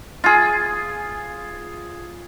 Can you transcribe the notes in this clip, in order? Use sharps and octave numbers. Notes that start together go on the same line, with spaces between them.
F4 G#4